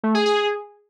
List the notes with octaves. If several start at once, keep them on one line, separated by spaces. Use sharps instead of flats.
A3
G#4
G#4